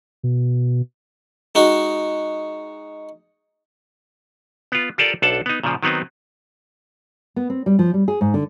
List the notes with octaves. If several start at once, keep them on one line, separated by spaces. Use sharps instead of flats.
B2
G#3 D#4 F#4
B3 F4
F4 G4 A4 A#4 D5 F5
B1 D4 A4 F#5 A5
B3 D#4
A#2 C#3 F3
D#3 F#3 B3 C4 D#4
B3
C4
G3
F3
G3
G#4
G#2
D3